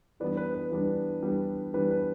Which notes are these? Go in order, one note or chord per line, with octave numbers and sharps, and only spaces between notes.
E3 G3 B3 D4 B4 D5
B4
B4
E3 G3 B3 D4
E3 G3 B3 D4
E3 G3 B3 D4 B4
B4